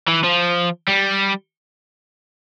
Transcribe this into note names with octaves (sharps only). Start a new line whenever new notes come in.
E3
F3
G3